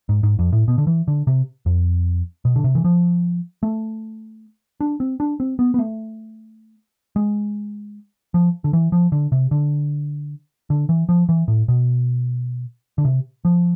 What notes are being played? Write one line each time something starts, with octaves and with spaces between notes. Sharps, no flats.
G#2
G#2
F2
A2
B2
D3
E3
D3
C3
F2
B2
D3
C3
E3
F3
A3
D4
C4
D4
C4
B3
B3
A3
G#3
F3
D3
E3
F3
D3
C3
D3
D3
E3
F3
E3
A2
B2
D3
C3
F3